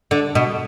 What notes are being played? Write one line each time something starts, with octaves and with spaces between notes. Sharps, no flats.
D3
B2